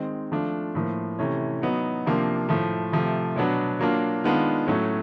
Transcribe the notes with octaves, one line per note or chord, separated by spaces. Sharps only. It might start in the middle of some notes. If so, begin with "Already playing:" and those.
Already playing: D#3 G#3 C4 D#4
F3 A3 D4 F4
A2 F3 A#3
C3 E3 A3 C#4
F#3 B3 D#4
C3 F3 A#3 D4 F4
A2 F3 A3
C3 F3 A3
B2 F#3 B3 D4
F#3 A#3 D4 F4
D#3 G#3 B3 D4 F4
A2 F#3 A3 C#4